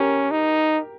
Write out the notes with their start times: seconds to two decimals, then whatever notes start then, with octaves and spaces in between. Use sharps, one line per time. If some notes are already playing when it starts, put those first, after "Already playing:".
Already playing: C#4 G4 A#4
0.31 D#4